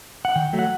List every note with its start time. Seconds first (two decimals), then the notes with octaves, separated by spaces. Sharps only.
0.25 F#5
0.36 D#3 G5
0.53 F#3 A3
0.59 F#5